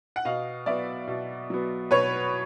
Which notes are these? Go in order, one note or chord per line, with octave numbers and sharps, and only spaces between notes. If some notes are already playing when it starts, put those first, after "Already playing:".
F#5
B2 D#5 F5
F#3 B3 D5 E5
B2
F#3 B3
B2 B4 C#5